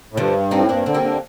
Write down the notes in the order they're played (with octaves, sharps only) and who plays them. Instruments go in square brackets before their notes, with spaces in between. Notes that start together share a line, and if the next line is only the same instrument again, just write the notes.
[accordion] A2
[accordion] G2 [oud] D3 F3
[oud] C4 D#4
[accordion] A2
[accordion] G2 [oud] A#3 D4
[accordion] D3 [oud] C4
[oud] G3 A#3
[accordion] D3